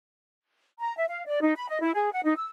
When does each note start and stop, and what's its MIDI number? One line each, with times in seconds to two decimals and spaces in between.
0.79 0.95 82
0.97 1.05 76
1.10 1.24 77
1.26 1.39 74
1.41 1.53 63
1.56 1.69 83
1.69 1.80 75
1.82 1.92 64
1.94 2.12 68
2.12 2.20 78
2.24 2.36 63
2.37 2.48 88